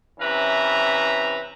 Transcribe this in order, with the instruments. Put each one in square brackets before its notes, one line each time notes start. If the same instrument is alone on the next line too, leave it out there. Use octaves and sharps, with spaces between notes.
[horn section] C3 E3 C#4 B4 E5 A#5